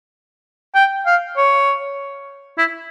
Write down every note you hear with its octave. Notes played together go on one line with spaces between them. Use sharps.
G5
F5
C#5
E4